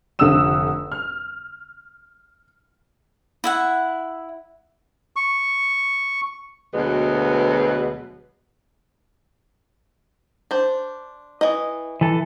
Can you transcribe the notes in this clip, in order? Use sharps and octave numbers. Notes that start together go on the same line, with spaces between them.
F1 D3 F#5 D#6 E6 E7
F6
E4 E5 F#5
C#6
D2 B2 F#3 G#3 B4
D4 C5
E3 D#5
E3 A4